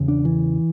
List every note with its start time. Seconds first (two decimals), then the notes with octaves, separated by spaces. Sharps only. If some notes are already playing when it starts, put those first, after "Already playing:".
Already playing: E2 C#3
0.08 D4
0.25 E3